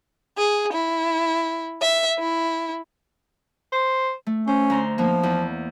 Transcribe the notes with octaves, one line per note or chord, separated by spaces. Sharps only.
G#4
E4
E5
E4
C5
A3
C#4 C5
D2 A#5 C6
F3 A#3 B3 D#4
E2